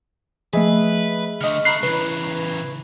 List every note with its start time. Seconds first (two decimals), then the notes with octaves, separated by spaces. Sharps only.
0.53 F3 A3 G#4 B4 D#5 E5
1.41 D3 A3 D#5 F6
1.65 A3 A#5 B5 F#6 C7
1.83 C#3 E3 B4